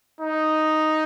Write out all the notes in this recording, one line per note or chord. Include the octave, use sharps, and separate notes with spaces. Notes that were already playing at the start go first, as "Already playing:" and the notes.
D#4